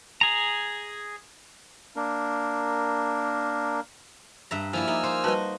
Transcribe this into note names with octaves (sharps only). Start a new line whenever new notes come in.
G#4 A#5
A#3 D4 A#4
G2 E5 A#5
F3 A#3 E4 D5 G#5 E6 F6
A#3 D#4 D5
A#4 C5 A#5
G3 F#4 B4 D#5 A5